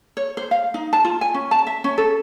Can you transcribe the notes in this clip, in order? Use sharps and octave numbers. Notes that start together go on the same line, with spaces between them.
C#5
C5
F5
D#4
A5
F4
G#5
C#4
A5
E5
C#4
A4